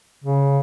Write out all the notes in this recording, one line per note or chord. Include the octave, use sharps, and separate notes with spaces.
C#3